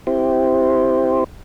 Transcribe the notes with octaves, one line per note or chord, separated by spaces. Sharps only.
C4 E4 G4 C5